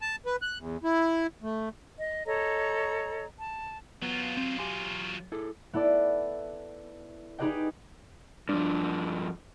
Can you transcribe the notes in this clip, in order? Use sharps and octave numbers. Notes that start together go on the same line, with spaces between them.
A5
B4
F#6
E2
E4
A3
D#5
A4 C#5 D#5 A#5
A5
F#3 B3 F4
C4
G4 G#5 C6
E4 G#4 A4
B3 E4 A4 D5
D#4 G4 G#4 B4 D#5 G5
G2 F3 D4